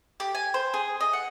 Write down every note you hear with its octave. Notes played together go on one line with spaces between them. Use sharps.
G4
G#5
C5
G#4
D#5
F#5